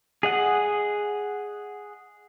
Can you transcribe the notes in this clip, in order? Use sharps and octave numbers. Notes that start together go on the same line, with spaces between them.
G#4 D#5 F#5